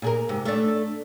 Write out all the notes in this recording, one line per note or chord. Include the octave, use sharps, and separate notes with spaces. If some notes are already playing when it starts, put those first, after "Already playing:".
A#2 G#4 A#4
G#2 C3
A3 D4